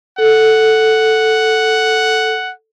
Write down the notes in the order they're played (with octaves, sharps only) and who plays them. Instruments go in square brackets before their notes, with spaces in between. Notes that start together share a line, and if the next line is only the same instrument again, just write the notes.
[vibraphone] A4 [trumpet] F#5